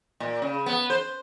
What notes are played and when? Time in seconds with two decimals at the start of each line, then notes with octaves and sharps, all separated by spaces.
0.20 A#2
0.42 C#3
0.66 B3
0.90 C5